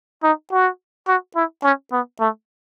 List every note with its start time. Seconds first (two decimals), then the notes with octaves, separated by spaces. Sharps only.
0.24 D#4
0.52 F#4
1.08 F#4
1.36 E4
1.63 C#4
1.92 B3
2.20 A3